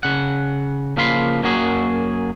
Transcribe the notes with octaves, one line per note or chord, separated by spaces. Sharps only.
C#3 F#5
C#3 F3 A#3 F5 B5 C6
F#2 F#3 A#3 F#4 G#4